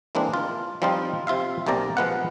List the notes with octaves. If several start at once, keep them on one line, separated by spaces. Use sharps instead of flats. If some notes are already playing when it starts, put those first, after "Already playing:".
E3 G#3 A#3 C4 D4
F4
F3 G3 C4 D#4 F4
C3 F4 E5 F5
B1 C3 A#3 D5 A#5
F3 G#3 B3 F5 F#5